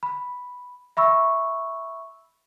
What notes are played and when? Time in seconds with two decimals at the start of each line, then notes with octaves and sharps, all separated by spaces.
0.03 B5
0.97 E5 B5 C#6 E6